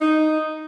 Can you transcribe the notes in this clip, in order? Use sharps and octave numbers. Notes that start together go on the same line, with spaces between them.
D#4